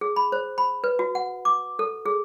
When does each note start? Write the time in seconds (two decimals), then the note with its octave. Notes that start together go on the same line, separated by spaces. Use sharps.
0.01 G#4
0.16 B5
0.32 C5
0.58 B5
0.84 B4
0.99 F#4
1.15 F#5
1.45 D6
1.79 A4
2.06 G#4